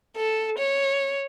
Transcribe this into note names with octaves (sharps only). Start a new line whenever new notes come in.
A4
C#5